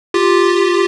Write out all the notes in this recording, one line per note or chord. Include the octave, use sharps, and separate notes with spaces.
F4 G4